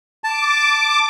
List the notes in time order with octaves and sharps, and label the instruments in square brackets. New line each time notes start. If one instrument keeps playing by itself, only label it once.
[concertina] A5 [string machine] D6